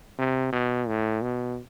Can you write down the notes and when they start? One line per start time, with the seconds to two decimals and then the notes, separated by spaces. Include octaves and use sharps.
0.19 C3
0.53 B2
0.88 A2
1.22 B2